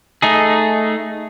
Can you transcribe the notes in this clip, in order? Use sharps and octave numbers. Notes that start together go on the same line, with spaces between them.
A3 D#4 G#4